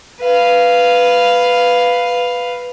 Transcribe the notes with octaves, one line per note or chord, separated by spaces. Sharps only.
B4 F5